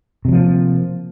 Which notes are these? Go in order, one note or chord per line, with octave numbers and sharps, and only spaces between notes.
C3 F3 F#3 A#3